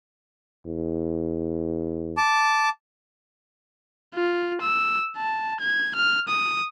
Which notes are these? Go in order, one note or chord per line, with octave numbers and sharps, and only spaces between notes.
E2
A5 D6
F4
E6
A5
G#6
F6
D#6